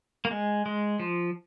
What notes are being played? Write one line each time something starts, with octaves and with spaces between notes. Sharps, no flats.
A#3
G#3
G#3
F3